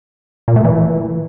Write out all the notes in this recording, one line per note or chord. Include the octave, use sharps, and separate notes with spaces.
A#2
A3
E3